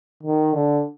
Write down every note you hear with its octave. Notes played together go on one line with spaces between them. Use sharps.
D#3
D3